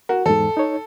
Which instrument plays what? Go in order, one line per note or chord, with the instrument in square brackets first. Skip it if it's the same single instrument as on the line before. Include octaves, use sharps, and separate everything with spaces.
[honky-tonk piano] F#4 [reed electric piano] A#4
[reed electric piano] E2 G#2 [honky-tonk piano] A4
[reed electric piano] D#4 C#5